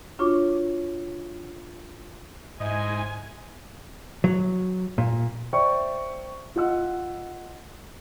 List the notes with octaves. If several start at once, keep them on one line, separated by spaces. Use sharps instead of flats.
D4 F4 F#4 C#5 C#6 D6
G#2 E4 C5 D#5 G#5
F#3
A#2
C5 D5 E5 G5 C#6
F4 D#5 F#5 E6